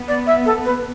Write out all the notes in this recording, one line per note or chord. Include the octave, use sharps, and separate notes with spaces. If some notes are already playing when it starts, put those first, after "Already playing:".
Already playing: B3
D5
E5
A4
B4